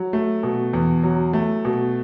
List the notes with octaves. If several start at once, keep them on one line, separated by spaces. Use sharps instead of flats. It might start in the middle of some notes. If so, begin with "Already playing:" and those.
Already playing: F#3
A3
B2
E2
F#3
A3
B2